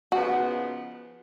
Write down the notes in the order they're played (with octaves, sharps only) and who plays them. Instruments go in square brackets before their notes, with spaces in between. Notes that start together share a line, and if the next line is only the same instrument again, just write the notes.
[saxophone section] C#3 F3 B3 D#4 [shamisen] F#4